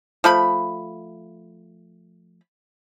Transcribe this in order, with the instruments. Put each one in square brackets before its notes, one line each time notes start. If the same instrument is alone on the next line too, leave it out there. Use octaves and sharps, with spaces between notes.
[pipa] F3 A3 B5